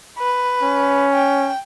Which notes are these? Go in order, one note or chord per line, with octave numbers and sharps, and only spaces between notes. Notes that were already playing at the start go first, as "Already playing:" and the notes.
B4
C#4
G5